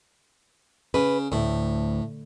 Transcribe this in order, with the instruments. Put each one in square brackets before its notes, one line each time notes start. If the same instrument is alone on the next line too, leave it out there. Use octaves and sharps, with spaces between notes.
[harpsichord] C#3 [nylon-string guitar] B4
[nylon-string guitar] D2 [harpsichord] A2